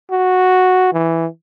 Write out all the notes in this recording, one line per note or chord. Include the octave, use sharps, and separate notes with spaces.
F#4
E3